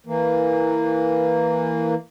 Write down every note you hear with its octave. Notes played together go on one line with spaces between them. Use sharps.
E3 A#3